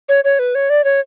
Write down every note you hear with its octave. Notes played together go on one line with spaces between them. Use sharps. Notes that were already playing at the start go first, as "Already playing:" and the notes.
C#5
C#5
B4
C#5
D5
C#5